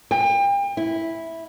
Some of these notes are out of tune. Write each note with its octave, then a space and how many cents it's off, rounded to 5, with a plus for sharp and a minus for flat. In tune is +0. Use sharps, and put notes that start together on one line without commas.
G5 +35
E4 -5